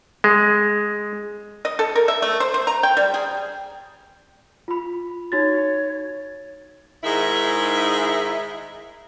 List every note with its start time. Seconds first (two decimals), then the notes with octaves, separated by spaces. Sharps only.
0.24 G#3
1.65 D#5
1.79 A4
1.96 A#4
2.08 E5
2.22 A3
2.40 C5
2.54 C5
2.67 A#5
2.83 G5
2.97 G3
3.14 G#4
4.68 F4 B5
5.32 D#4 F#4 C#5 A6
7.04 G#2 D#3 G#3 E4 E5